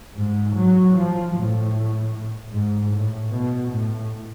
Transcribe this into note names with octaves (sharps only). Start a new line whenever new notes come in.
G#2
F#3
F3
A2
G#2
A2
B2
A2